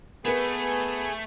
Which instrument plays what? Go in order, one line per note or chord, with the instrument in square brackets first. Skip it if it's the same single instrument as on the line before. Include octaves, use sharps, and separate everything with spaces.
[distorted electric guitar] A3 [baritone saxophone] B3 [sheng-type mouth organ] G#4 G#5 [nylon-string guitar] A#4 B4